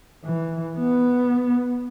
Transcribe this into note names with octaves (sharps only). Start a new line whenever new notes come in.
E3
B3